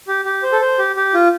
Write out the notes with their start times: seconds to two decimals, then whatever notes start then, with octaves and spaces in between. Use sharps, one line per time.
0.08 G4
0.25 G4
0.43 C5
0.52 A4
0.61 C5
0.79 G4
0.96 G4
1.14 F4